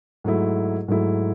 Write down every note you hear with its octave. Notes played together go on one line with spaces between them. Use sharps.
G#2 F#3 A3 E4
G#2 F#3 A3 E4